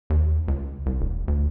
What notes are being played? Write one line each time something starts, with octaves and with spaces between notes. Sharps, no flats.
D#2
C#2
C2
E1
D2